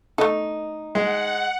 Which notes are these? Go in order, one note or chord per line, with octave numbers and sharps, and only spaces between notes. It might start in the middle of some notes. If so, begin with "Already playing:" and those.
A3 D#4 A4
G#3 F#5